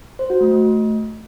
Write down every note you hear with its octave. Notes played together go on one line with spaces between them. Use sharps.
C5
F#4
A3
A3